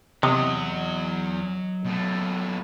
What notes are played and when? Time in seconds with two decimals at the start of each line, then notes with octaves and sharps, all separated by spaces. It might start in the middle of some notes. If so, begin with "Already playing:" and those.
0.23 E2 C3 F#3 D#5 D#6
1.85 B2 A3